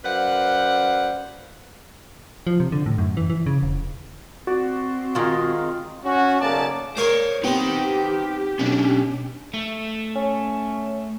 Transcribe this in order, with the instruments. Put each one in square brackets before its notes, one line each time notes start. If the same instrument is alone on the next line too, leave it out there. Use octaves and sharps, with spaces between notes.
[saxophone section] F#2 B4 C5 D5 F5 F#5
[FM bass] F3
C3
D3
A2
F#2
E3
E3
C#3
E1
[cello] C4 [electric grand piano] F#4 [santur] D5
[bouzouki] D#3 G#3 [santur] F4 F5 A#5
[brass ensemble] C#4 F#4
B1 C#3 A#3 C#4 D5 A5
[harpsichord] G#4 A#4 F5 [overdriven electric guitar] C5 C#5
[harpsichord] B3 C4 [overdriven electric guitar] D#4 G5 [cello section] G4
[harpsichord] B1 [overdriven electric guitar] C#4 D4
[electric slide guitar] A3
[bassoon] C#4